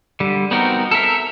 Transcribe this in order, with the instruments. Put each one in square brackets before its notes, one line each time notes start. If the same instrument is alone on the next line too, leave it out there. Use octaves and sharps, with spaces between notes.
[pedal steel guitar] D3 G3
B3 C4 D#4 F#4 A#4
A4 A#4 E5